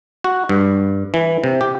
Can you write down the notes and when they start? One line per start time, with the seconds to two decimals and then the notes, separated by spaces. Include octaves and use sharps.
0.24 F#4
0.49 G2
1.14 E3
1.44 C3
1.61 G4